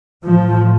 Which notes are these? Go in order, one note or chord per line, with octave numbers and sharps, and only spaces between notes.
A2 F3